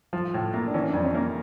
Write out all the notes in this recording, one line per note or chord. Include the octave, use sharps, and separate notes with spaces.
F3
A2
A#3
D4
E3 C#4
F2 D4
C#4
A#3